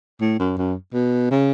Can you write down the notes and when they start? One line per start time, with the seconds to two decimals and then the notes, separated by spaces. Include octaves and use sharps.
0.21 A2
0.40 F#2
0.58 F#2
0.94 B2
1.31 C#3